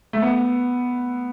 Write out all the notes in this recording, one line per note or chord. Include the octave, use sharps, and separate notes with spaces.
A3
B3